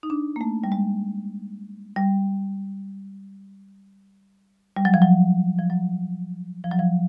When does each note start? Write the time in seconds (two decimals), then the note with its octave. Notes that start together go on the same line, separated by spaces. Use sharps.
0.03 D#4
0.10 D4
0.36 A#3
0.41 A3
0.64 G3
0.72 G#3
1.96 G3
4.76 G3
4.85 F#3
4.94 F3
5.02 F#3
5.59 F3
5.70 F#3
6.64 F3
6.71 F#3
6.79 F3